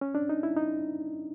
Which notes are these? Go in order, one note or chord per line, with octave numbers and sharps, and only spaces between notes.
C#4
D4
D#4
E4
D#4